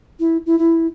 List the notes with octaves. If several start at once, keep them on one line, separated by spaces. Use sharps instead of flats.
E4
E4
E4